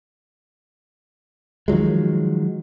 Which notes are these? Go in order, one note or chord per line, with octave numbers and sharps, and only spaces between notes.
D#3 F3 F#3 G#3